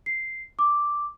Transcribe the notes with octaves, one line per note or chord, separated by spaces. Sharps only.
C7
D6